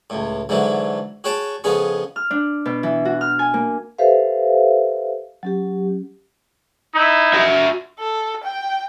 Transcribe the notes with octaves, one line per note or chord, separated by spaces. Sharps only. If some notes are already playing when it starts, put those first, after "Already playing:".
C#2 A2
G#2 D3 E3 F#3
F#4 G#4 C#5 G5 A5
F2 C#3 B3 G#4 C#6
F6
D4
B2
E3
F#4
F6
G#5
A#3
G4 A4 B4 C5 E5 F5
F#3 C#4 G4
D#4 E4
F#4 E5
A4
G5